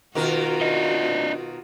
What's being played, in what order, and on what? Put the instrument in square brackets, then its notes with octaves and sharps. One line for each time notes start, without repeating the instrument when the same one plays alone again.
[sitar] B2 D#3 A#4 [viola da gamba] F4 F#4
[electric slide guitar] D4 D#5